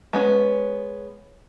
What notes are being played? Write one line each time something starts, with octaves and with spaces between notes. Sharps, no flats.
G#3 B3 C#4